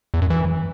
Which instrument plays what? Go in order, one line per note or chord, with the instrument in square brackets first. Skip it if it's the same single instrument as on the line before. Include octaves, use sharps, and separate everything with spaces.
[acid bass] E2
F#2
E3